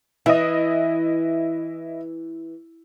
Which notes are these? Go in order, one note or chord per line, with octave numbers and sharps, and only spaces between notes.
E3 E4 D#5